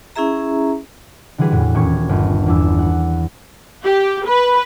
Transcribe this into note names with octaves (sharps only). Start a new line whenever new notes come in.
C#4 E4 G#4 E5 A#5
D3 E3 G3 F#4 G#4 B4
E2 A2
D#1 C#6 G#6
G1
E2 D4 E6
F#5
G4
B4